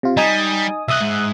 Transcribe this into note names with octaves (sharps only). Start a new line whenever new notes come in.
C3 F4
G3 D#4 G#5 D#6
C2 D#5 E5 D#6 F#6
G#2